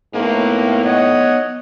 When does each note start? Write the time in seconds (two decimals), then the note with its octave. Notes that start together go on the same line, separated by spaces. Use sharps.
0.14 A2 A#3 B3 D#4
0.85 C#5 D#5 F#5